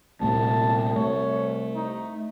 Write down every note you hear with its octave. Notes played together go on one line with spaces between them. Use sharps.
C2 A#2 A3 B3 A5
A3 C#5
D#4